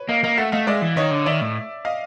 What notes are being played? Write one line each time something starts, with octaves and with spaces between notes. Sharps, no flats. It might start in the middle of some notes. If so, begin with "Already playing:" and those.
Already playing: B4 C#5
A#3 D#5 F5
A#3 D#5 F5
A3 E5 F#5
A3 D#5 F5
G#3 D5 E5
E3
D#3 C#5 D#5
D3
D#3 D5 E5
A2
D#5 F5